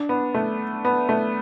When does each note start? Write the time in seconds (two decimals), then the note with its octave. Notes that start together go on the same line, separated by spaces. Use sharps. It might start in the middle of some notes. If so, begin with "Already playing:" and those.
Already playing: D4
0.09 B3
0.34 A3
0.85 B3
1.09 A3